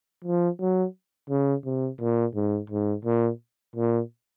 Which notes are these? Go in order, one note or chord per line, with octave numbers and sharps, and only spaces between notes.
F3
F#3
C#3
C3
A#2
G#2
G#2
A#2
A#2